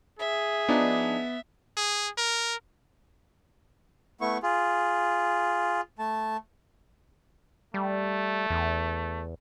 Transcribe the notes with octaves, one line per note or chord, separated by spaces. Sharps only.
G#4 E5
F3 B3 D4 D#4
G#4
A#4
A3 B3 E4 C#6
F4 G#4
A3 A5
G3 A3
E2